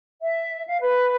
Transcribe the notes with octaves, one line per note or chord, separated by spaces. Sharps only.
E5
F5
B4